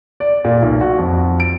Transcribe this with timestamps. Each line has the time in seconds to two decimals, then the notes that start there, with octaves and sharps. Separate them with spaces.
0.20 D5
0.45 A#2
0.62 B1
0.81 F#4
0.98 F2
1.40 D7